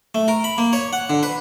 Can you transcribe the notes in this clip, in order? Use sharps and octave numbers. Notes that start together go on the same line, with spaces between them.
A3
A#4
B5
A#3
C#5
F#5
D3
B4